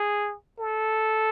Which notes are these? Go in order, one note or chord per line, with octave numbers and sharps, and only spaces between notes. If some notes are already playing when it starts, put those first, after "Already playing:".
Already playing: G#4
A4